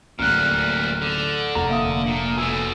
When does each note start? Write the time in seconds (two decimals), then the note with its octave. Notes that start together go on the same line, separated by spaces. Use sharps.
0.19 D1 A1 A#2 G3 F6 F#6
1.02 D3
1.55 F1 F#5 A#5 F6
1.70 A#3 E5 F5 D#6
2.07 A#2
2.38 B2 A3 G#5 E6